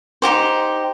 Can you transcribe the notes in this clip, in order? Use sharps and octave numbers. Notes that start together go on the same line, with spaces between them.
D#4 F#4 G4 C5